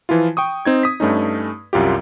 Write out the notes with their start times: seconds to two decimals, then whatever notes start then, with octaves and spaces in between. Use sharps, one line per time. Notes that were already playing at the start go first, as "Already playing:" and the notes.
0.09 E3 F3 E4 F4
0.37 G5 C#6 D#6
0.65 C4 D#4 G#6
0.83 D#6 B6
1.00 G2 A3 C#4 D#4
1.73 C2 F#2 F4 G4